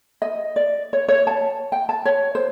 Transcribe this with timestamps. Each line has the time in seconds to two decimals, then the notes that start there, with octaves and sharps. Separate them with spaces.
0.22 D#5
0.56 D5
0.93 C#5
1.08 C#5
1.27 A5
1.72 G5
1.89 A5
2.05 C#5
2.35 C5